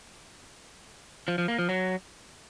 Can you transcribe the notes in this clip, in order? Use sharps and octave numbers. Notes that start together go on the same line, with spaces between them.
F3
F3
A#3
F3
F#3